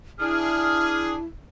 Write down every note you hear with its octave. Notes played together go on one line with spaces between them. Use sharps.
D4 E4 G#4 F6